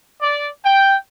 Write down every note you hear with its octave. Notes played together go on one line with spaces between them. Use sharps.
D5
G5